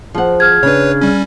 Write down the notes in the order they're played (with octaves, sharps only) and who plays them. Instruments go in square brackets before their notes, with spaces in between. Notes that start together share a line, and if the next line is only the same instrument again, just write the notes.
[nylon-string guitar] F3 F#5 [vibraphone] G#4 C5
[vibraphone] G#4 [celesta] F6 G#6
[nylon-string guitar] C#3 D4 [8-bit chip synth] B4 C#5
[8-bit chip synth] G3 C#4